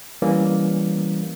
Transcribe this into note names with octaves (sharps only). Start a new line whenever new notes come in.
E3 G3 A#3 C#4